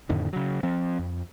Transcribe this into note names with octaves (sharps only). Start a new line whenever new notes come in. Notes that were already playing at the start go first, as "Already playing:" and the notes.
F2 A2 D3 D#3
C#3 F#3
F3 C4
F2